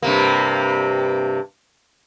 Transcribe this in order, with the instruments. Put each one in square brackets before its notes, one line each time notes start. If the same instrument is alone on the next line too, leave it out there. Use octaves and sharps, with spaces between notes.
[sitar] G2 C3 A#3